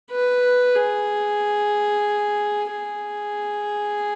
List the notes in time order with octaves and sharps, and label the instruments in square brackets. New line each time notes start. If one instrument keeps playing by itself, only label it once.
[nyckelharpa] B4
G#4
G#4